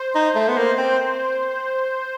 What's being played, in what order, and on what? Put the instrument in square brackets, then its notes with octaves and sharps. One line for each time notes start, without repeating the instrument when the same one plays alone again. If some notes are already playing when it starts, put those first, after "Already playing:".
Already playing: [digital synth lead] C5
[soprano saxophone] D#4
A3
B3
A#3
C4